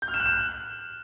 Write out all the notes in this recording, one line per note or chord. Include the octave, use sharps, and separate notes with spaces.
G6
F6
E7
F#6
E7